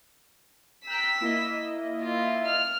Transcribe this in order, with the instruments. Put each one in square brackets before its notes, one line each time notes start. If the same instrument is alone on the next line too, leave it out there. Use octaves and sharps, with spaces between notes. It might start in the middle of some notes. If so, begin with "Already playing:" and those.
[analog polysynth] G5 A#5 F#6 [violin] E6 B6
[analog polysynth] A#3 E4 D#5
[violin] F4
F6